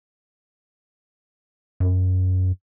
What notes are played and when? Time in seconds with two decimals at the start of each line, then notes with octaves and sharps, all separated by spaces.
1.80 F#2